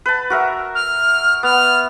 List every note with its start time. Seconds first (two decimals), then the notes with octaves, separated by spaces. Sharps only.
0.06 B4 A5
0.30 F#4 A#4 E5
0.75 F6
1.43 B3 F6